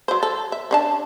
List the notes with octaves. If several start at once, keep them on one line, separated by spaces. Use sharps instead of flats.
F#3 C5
A4
E5
C#4 D4 A5